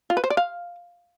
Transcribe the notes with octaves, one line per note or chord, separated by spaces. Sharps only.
F4
B4
C5
D5
F5